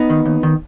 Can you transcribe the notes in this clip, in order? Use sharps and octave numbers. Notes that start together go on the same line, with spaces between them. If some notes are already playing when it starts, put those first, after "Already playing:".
Already playing: B3 D#4
D#3
D#2
D#3